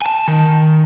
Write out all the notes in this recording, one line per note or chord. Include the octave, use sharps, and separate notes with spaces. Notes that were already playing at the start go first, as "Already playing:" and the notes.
G#5 A5
D#3